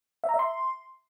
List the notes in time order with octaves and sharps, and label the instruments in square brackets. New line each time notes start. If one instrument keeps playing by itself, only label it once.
[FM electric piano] E5
A#5
E5
C6